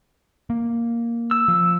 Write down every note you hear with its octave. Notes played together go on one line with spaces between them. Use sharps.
A#3
E6
F3